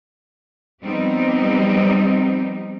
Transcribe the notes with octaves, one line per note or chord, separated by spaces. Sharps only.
F3 G3 B3 C4 D#4 G4